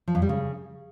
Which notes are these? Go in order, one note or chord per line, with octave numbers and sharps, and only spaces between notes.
F3
F2
G3
C#3